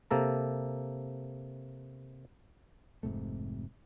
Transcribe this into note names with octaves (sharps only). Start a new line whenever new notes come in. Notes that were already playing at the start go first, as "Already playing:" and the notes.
C3 A#3 A4 A#5
F1 G#2 C3 A3